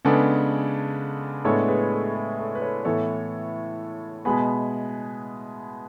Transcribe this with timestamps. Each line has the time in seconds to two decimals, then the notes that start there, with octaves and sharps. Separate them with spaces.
0.05 C#3 G#3 B3 D4 A4
1.45 A2 G#3 B3 D4 A4 C#5
1.68 G#4 B4
1.92 A4
2.14 G#4
2.39 A4
2.55 B4
2.61 A4 C#5
2.85 A2 E3 B3 A4 C#5
4.25 B2 G#3 B3 G#5 B5